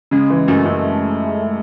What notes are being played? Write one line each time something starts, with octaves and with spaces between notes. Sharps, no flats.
C#3 G#3
E3
F#2 A3
F#2